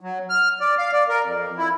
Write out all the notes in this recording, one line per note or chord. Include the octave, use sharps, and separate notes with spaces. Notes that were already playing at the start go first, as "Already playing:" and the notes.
F#3
F6
D5
F5
D5
A#4
F2
E4